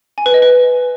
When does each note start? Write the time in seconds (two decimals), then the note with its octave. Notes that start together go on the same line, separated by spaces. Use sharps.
0.18 G#5
0.26 B4
0.34 D#5
0.42 B4